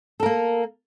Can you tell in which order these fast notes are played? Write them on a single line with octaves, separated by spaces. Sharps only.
A4 A#4 A#3